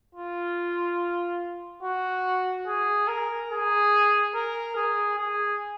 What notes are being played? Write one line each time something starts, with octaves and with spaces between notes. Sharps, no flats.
F4
F#4
G#4
A#4
G#4
A#4
G#4
G#4